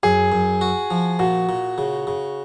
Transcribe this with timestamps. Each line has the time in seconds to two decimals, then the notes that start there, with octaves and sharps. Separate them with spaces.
0.03 F#2 G#4
0.32 F#2
0.61 F#4
0.90 F3
1.19 A#2 F#4
1.49 A#2
1.78 C#3
2.07 C#3